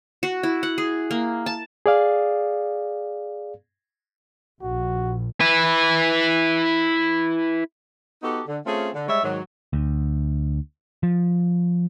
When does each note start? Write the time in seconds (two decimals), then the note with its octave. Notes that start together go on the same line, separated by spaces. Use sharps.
0.23 F#4
0.43 E4
0.63 F#5
0.78 G#4
1.11 A#3
1.46 A5
1.86 G#4 D5 F5
4.62 A#1 F#4
5.41 E4 B4
8.23 B3 D#4 F#4 G4 A4
8.47 D3
8.66 A3 C4 C#4 F4 G#4
8.94 D3
9.08 G3 G#3 C#5 E5
9.24 G#2 D#3 F#3
9.73 D2
11.03 F3